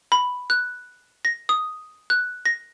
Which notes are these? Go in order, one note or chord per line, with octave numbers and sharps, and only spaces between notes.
B5
F#6
A#6
D#6
F#6
A#6